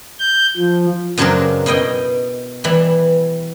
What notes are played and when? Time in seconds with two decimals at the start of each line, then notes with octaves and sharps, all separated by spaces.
0.19 G6
0.57 F3
1.18 F#2 C#3 F#3 C4 D4 A#4
1.66 B2 E4 D#5 G5
2.64 E3 G3 E4